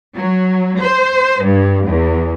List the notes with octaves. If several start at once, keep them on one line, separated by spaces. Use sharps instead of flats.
F#3
C5
G2
E2